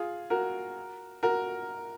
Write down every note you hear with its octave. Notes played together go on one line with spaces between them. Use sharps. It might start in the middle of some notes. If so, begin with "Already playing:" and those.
Already playing: F4 G#4
F#4 A#4
F#4 A#4